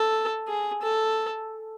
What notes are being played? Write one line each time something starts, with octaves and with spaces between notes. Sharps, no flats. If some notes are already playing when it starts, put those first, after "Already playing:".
Already playing: A4
G#4
A4